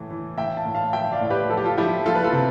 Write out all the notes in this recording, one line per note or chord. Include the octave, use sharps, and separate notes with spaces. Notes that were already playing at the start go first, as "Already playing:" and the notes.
Already playing: A2 E3
E3
A2 E5 G5
F5 A5
A2
F5 A5
F3 E5 G5
D5 F5
A2
G4 B4
F3 A4
G4
F4 A4
F3 E4 G4
F3 F4 A4
B4
F4 A4
C3